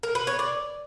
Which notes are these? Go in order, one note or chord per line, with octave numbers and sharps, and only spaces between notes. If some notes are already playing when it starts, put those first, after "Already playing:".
A#4
B4
C#5
D5